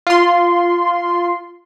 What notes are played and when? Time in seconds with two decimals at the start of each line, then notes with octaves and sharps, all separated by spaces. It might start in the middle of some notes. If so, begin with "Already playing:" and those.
0.07 F4 C6